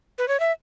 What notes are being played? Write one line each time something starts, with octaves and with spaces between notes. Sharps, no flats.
B4
C#5
E5